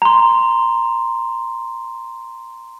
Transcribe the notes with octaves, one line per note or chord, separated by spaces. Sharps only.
A#5 C6